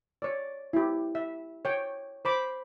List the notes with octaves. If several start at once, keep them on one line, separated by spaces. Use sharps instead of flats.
C#5 D5
E4 G4
E5
C#5 G5
C5 B5 D6